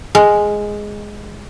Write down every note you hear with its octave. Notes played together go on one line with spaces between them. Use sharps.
G#3